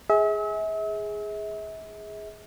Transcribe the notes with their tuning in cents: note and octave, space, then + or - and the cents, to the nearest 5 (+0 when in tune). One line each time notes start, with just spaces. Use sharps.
G#4 +0 E5 -40